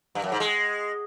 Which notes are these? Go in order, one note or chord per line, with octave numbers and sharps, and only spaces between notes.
G2
F#2
G#2
G#3